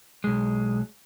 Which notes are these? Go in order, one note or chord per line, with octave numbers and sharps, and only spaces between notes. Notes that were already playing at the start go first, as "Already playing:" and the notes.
B1 G#3